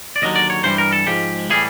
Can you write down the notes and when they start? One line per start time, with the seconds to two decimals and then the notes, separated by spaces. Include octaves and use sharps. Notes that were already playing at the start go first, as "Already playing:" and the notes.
0.16 D5
0.22 D#2 D3 F#3 D#5
0.36 D5
0.50 C#5
0.64 G2 E3 G3 C5
0.78 A#4
0.92 A4
1.06 G#2 F3 G#3 G4
1.50 A2 E3 G3 G#4